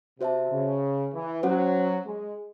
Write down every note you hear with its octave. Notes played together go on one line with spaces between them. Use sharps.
C3 F#4 C5 E5 A5
C#3
E3
F#3 C#4 F#4 C5 F#5
G#3